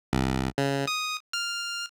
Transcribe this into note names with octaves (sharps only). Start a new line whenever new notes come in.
C2
C#3
D#6
F6